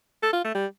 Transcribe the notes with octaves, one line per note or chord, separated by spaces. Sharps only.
A4
F4
A3
G3